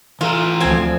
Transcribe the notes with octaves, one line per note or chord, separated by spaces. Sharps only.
E3 F4 A4 A#5
D2 F3 C4 G#5